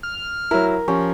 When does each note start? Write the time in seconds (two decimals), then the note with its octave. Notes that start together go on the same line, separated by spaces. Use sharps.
0.03 F6
0.51 F#3 E4 A#4
0.88 F3 C#4 G4